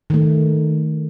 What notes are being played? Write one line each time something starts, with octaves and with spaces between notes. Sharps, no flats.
D#3 A3